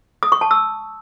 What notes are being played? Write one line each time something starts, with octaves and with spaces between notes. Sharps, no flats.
D#6
C#6
A5
E6